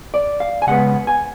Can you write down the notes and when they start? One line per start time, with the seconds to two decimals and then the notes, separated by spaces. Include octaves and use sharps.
0.14 D5
0.40 F5
0.62 G#5
0.67 C#3 G#3 B3 F#5
1.07 G#5